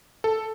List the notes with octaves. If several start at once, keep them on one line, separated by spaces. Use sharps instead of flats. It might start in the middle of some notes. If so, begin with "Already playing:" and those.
A4